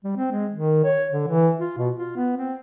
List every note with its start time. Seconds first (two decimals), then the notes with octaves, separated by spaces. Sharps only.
0.04 G3
0.17 C4
0.32 G#3
0.52 D#3
0.85 C#5
1.12 D3
1.28 E3
1.60 F4
1.78 B2
1.95 F4
2.16 B3
2.37 C4